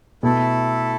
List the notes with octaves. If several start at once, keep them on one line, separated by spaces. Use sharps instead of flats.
B2 A3 E4 A4